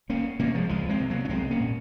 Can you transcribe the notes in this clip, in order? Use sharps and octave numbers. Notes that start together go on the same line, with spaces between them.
C#2 A#3 C#4
C3 A#3 C#4
F3 G#3
C#2 F3 G#3
G#3 C4
C3
F#3 A#3
C#4
C2 G#3 C4
A#3 C#4
A#2